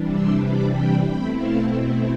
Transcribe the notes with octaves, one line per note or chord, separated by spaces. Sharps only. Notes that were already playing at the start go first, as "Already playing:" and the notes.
Already playing: C3 E3 G3 D4
C6 E6
B5 D6
G5 B5
B2 A3 C4 E4 G5 B5
F5 A5